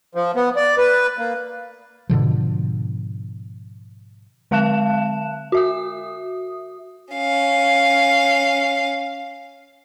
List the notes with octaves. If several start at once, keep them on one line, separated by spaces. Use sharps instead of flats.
F3
B3
D5
B4
A#3
G#2 B2 D3 F3
D3 G#3 F5 A5 F#6 E7
F#4 E5 D#6
C#4 F5